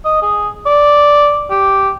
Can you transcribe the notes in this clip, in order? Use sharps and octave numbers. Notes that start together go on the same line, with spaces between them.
D#5
G#4
D5
G4